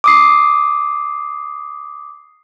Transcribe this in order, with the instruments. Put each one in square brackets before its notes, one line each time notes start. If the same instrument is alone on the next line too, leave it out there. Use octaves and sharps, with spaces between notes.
[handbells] D6 D#6 C7